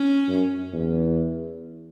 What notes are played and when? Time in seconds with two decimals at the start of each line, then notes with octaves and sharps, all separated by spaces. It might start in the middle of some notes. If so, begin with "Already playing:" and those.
Already playing: C#4
0.29 F#2
0.73 E2